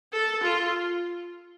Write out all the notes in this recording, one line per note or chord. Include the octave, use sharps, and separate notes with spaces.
A4
F4